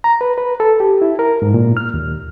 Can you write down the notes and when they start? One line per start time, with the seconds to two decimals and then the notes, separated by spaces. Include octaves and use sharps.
0.04 A#5
0.21 B4
0.38 B4
0.60 A4
0.80 G4
1.02 E4
1.19 A#4
1.42 G#2
1.54 A#2
1.77 F6
1.94 D#2